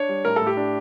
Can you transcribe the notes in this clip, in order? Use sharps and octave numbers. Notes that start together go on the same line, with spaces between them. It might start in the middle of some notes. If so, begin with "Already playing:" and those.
Already playing: D4 C#5
G3
A2 A#4
A2 A4
G4
D4